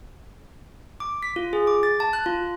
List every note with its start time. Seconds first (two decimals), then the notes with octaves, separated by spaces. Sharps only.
1.00 D6
1.23 B6
1.36 F4
1.53 G#4
1.67 D6
1.83 A6
2.00 A5
2.13 F#6
2.26 F4